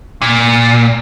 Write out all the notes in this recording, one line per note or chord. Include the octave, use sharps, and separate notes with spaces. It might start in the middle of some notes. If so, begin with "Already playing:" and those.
A#2